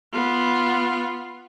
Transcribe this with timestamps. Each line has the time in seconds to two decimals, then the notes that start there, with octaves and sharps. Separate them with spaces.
0.13 B3 F4